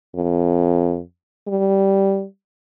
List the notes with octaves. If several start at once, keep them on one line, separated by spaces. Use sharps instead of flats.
F2
G3